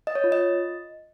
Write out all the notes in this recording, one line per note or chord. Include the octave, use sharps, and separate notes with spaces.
D#5
C#5
F4
D#5